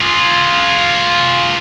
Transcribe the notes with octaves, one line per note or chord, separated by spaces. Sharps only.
F4 G#4